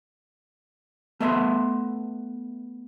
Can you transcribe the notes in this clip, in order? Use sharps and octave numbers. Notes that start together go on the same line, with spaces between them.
A3 B3 E5 A5 C6